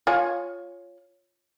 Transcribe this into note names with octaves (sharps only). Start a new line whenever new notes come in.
F4 C#5 G#5